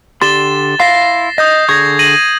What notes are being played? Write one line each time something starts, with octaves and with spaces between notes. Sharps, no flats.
D3 G4 C6 A6 E7 G7
E4 F5 C6 A#6 C7
D#5 D#6 G6 A#6
D3 G#4 C#6 G#6 A#6
A#6 D#7 F#7